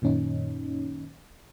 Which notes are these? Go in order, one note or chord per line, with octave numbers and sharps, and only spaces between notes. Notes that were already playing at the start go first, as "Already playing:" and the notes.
F#2 A#2 D#3 C#4 D#4